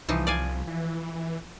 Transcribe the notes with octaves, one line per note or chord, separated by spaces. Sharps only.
C2 E3 F3 D#4
D5 F5 G#5
E3